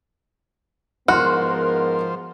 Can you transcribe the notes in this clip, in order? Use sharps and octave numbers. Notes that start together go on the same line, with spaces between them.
G#2 F3 B3 F#4 A#4 C5 C6 F6